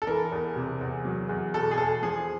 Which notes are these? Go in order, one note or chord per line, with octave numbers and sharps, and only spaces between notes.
A4
E3 A#4
E2
C3
E2
F#3
E2
B2 A4
G#4
E2 A4
F3 G#4